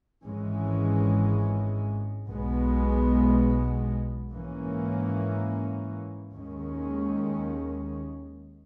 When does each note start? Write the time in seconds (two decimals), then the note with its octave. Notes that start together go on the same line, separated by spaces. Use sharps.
0.25 G#1 G#2 E3 G#3 C#4
2.28 B1 B2 G#3 B3
4.30 G#2 E3 A#3 C#4
6.34 D#2 D#3 G#3 C#4